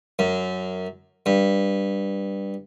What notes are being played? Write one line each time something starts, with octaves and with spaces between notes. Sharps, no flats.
F#2
G2